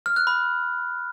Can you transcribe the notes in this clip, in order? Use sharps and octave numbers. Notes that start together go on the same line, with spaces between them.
F6
F#6
B5